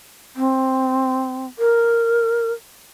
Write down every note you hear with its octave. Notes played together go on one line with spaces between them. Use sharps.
C4
A#4